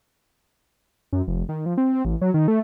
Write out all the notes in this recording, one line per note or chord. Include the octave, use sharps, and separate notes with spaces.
F#2
F1
D#3
F3
C4
C4
A1
F#3
D#3
A3